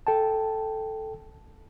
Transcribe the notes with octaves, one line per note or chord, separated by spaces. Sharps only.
A4 G5 A5